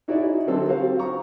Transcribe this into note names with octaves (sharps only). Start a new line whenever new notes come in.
D#4 E4 F#4 G#4 C#5 D5
D3 F#3 C4 A4
G3 F#4 C5 F5
A#5 C#6